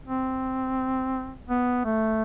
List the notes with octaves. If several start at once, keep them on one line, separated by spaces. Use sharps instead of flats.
C4
B3
A3